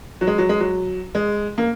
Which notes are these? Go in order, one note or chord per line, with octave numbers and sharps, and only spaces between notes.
F#3
G#3
F#3
G#3
F#3
G#3
A#3